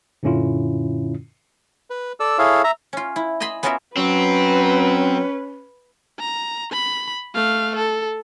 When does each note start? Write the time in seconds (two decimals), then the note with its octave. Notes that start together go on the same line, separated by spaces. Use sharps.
0.23 F#2 A#2 D3 C#4 E4 F4
1.90 B4
2.20 A4 D5 E6
2.39 E4 G#4 A4 C#5 F5
2.64 E5 A#5
2.93 C#4 F4
3.16 E4
3.40 D#5 E5 G#5 B5 C6
3.63 B3 C#4 F4 F#4 A#4 E5
3.97 F#3 C4 C#4 B4
6.19 A#5
6.72 B5
7.35 A3 F5
7.76 A4